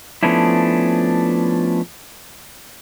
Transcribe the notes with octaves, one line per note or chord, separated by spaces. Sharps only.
F3 A3 B3 C#4 D4 E4